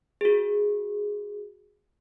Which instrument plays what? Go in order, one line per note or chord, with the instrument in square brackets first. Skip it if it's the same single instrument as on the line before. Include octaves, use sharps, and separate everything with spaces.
[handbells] F#4 G#4